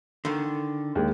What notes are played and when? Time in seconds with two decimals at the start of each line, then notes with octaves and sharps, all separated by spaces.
0.25 D3 D#3
0.95 D#2 G#3